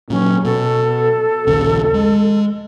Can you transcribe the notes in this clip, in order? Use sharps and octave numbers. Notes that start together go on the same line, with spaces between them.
A#2 F#3 C#4
B2 A4
A#1 D#2 C#3
G#3